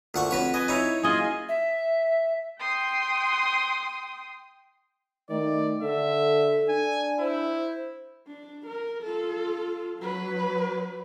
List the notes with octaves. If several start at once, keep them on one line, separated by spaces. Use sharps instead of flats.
D2 A#2 F#5 C#6
F2 F#4 B4 C#5
B4 D#5 G#5
D#4 E4 C#5
F#1 F4 G#4 D#5 G#5
E5
G5 C6 D#6
D#3 A3 D5
D3 A4 E5
D4 G#5
E4 C5
D4
A#4
F4 A4
F#3 B4